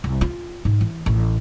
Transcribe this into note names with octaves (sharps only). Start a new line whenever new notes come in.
C2
F4
G#2
E3
A1